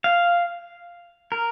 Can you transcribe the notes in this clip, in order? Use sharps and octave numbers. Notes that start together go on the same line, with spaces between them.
F5
A#4